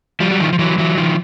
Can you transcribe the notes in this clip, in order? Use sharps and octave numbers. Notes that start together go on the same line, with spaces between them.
F3 G3
F#3
D#3 F3
F3
E3 F#3
E3 F#3
D#3 F3